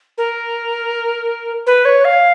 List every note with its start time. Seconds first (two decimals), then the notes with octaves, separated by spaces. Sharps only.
0.17 A#4
1.66 B4
1.85 C#5
2.04 F5